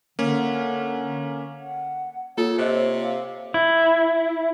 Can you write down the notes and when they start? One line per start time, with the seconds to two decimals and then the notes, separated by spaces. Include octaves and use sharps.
0.19 D3 A#3 C#4
1.60 F#5
2.38 A#3 F4 A4 C#5
2.58 C3 C5 D#5
3.02 F5
3.54 E4